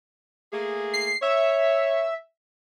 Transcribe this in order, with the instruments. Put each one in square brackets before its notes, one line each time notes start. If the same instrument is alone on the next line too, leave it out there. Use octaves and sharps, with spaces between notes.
[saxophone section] A3 A#3 G#4
[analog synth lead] C7
[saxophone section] C#5 [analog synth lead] E5